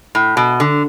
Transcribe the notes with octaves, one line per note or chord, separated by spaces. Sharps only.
A2
B2
D3